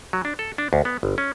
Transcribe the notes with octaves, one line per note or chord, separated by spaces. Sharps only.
F#3
D4
A4
D4
D2
B3
G1
C#4